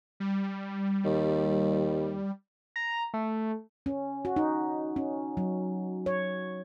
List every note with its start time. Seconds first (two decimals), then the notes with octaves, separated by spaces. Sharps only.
0.20 G3
1.05 D#2
2.76 A#5
3.14 A3
3.86 C#4
4.25 F#4
4.36 D#4
4.96 C#4
5.37 F#3
6.06 C#5